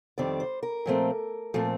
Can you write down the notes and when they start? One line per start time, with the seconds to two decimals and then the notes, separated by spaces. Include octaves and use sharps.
0.18 F2 D#3 G3 C4 D5
0.40 C5
0.63 A#4
0.86 A#2 F3 A3 C4
1.54 A#2 F3 A3 C4